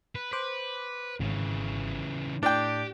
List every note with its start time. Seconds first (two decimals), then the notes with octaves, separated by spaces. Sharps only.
0.15 B4
0.33 B4 C5 D6
1.20 G#1 C#3 E3
2.43 A2 D4 G4 G5